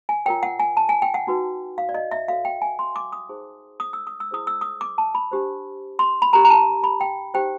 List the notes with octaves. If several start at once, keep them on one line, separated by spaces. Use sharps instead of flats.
G#5
F4 A#4 C#5 G5
F#5
G#5
A5
G#5
G5
F#5
D#4 F#4 B4
F5
D5
D#5
E5
F#4 A4 C#5 F5
G5
G#5
C6
D6
D#6
D#4 G#4 C5
D#6
E6
D#6
E6
E4 G#4 C5 D#6
E6
D#6
D6
A5
B5
D4 G4 C5
C6
B5
D4 G4 A#4 A#5
A#5
A5
B5
G5
D#4 G4 C5 G5